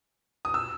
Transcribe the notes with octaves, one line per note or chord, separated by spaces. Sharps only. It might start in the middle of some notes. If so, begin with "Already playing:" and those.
D#6
E6